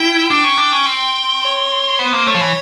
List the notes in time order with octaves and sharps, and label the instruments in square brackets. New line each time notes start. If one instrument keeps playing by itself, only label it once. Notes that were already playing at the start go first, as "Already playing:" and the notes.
Already playing: [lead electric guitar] E4 [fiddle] G5
[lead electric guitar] D4 [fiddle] G5
[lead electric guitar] C#4
D4
C#4
C4
[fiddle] C#5
[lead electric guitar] B3 [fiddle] C5
[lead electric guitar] A#3
[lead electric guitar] A3 [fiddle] C#5
[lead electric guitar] F3
E3